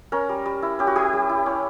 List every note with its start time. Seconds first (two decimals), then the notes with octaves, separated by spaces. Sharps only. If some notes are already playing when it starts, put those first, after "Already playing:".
0.12 C#4 A#4
0.29 G3
0.46 G3
0.63 E4
0.79 C#4 G4
0.87 F#4
0.96 G3 G4
1.13 G3
1.29 E4
1.46 C#4